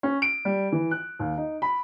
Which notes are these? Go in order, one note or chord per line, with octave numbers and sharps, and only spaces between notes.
C#4
D7
G3
E3
F#6
D#2
D#4
B5